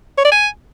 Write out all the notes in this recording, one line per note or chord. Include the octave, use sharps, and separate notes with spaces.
C#5
D5
G#5